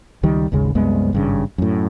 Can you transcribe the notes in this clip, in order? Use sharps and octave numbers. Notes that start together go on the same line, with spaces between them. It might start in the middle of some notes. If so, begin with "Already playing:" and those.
C#2 D#3 G3
G#1 D#2 C#3 G#3
C2 F#2 G#3 B3
G#1 G2 C#3
F#2 A2